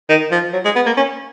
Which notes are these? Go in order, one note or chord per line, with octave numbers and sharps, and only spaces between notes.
D#3
F3
F#3
G#3
B3
A#3
C#4